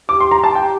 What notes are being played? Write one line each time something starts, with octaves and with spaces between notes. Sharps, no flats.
G4 D6
C6
A#5
A5
G5